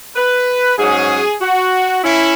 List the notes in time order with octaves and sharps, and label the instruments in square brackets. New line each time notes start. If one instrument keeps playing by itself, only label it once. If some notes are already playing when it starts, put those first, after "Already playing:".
[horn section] B4
G#2 F#3 C#4 G#4
F#4
C#4 E4